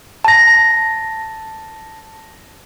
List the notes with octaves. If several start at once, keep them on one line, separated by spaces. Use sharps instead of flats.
A5 A#6